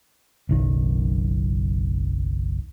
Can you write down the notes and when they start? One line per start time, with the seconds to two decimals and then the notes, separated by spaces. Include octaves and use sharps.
0.49 F#1 B1 D#3